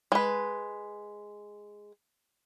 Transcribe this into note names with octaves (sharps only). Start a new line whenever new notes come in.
G#3 B4